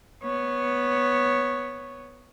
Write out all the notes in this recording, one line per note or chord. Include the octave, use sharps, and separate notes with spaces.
B3 C#5